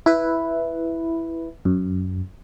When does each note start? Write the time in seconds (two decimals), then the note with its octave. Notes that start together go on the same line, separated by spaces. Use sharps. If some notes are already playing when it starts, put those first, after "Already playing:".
0.06 E4 B4
1.65 F#2